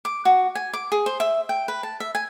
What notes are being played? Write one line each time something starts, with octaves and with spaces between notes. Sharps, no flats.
D6
F#4
G#5
D6
G#4
C5
E5
G5
B4
A5
E5
G#5